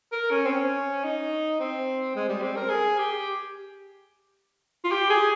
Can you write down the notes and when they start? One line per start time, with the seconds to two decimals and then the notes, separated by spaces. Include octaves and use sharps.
0.12 A#4
0.31 C#4
0.45 C4
0.48 C#4
1.04 D#4
1.60 C4
2.15 G#3
2.28 G3
2.42 C4
2.56 A#4
2.70 G#4
2.98 G4
4.84 F4
4.92 G4
5.10 G#4